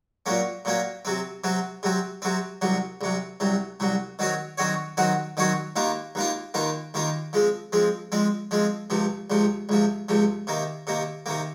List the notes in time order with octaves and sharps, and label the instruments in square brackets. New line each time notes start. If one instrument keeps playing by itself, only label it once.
[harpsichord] A#2 F#3 A#3 C#4
A#2 F#3 A#3 C#4
C3 F#3 C4
C3 F#3 C4
C3 F#3 C4
C3 F#3 C4
C2 C3 F#3
C2 C3 F#3
C2 C3 F#3
C2 C3 F#3
D#3 F#3 C4 F#4 C#5
D#3 F#3 C4 F#4 C#5
D#3 F#3 C4 F#4 C#5
D#3 F#3 C4 F#4 C#5
D#2 D#3 A#3 F4
D#2 D#3 A#3 F4
D#2 D#3 A#3 F4
D#2 D#3 A#3 F4
F3 G#3 C4
F3 G#3 C4
F3 G#3 C4
F3 G#3 C4
C#2 C3 F3
C#2 C3 F3
C#2 C3 F3
C#2 C3 F3
C3 D#3 A#3
C3 D#3 A#3
C3 D#3 A#3